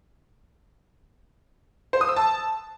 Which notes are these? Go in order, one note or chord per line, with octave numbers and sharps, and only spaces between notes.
C5
D#6
E6
A5